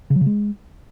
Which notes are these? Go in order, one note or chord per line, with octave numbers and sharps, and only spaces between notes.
C#3
F#3
C#3
G#3